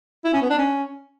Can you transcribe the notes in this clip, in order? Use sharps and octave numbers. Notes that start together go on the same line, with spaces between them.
E4
C#4
B3
D4
C#4